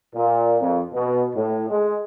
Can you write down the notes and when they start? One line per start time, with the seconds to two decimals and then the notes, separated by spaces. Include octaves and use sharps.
0.15 A#2
0.62 F2
0.94 B2
1.36 A2
1.70 G#3